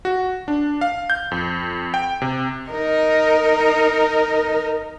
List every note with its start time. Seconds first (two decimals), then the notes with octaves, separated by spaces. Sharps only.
0.05 F#4
0.48 D4
0.81 F5
1.10 G6
1.31 F2
1.94 G5
2.22 C3
2.70 D#4 A#4